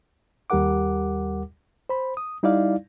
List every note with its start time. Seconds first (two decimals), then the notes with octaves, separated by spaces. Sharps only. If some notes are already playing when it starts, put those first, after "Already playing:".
0.50 D#2 G3 G4 A#4 F#5 D6
1.89 C5 B5
2.17 D#6
2.43 G3 D#4 E4 D5 F5